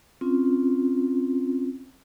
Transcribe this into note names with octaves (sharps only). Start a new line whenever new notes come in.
C4 C#4 F4